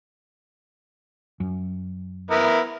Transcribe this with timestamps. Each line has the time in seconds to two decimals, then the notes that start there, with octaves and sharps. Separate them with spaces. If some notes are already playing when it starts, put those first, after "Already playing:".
1.40 F#2
2.31 B3 E4 A#4